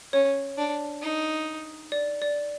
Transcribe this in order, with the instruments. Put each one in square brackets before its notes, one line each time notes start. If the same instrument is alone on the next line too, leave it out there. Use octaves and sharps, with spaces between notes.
[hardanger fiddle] C#4 [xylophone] C#5
[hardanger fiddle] D4
D#4
[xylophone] D5
D5